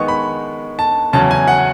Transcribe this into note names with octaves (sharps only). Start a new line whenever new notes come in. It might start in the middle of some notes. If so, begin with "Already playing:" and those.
Already playing: D#3 G#3 B3 D#4 C#6
B5
A5
E2 C#3 F#3 C#4 A5
G#5
F#5